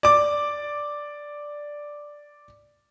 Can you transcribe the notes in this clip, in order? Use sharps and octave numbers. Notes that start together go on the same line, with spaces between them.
D5 D6